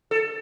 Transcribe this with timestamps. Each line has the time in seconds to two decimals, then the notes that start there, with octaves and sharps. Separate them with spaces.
0.11 A4